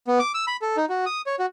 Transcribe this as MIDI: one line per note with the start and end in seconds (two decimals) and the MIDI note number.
0.07 0.19 59
0.19 0.32 86
0.34 0.45 88
0.47 0.57 83
0.62 0.76 69
0.77 0.85 63
0.89 1.05 66
1.06 1.22 87
1.26 1.36 73
1.39 1.46 66